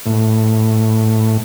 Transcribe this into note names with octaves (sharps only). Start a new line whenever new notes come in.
A2